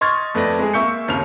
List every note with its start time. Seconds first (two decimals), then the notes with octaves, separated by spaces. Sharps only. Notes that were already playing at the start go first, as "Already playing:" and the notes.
0.01 D#5 C6 C#6 F6 G#6 A6
0.35 F2 A3 B4 D5 A#6
0.59 G#3 G#4
0.74 A#3 E5 C#6 G6 C#7
1.08 G1 D#2 C#3 A#4 F7